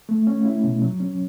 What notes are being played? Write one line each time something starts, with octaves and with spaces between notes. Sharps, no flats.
A3
C#4
E4
B2
F#3
C#4